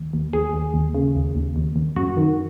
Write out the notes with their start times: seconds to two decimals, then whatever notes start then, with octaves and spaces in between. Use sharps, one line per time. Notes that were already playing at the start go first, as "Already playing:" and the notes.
Already playing: D#2
0.13 D#2
0.33 D#2 G#4
0.54 D#2
0.74 D#2
0.95 C#3
1.15 D#2
1.35 D#2
1.56 D#2
1.76 D#2
1.96 F#2 F#4
2.17 D#3